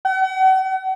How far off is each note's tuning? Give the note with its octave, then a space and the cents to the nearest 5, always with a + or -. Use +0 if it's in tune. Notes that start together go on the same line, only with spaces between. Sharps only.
F#5 +40